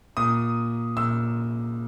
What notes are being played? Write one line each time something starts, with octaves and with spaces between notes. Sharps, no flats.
A#2 D#6
A#2 E6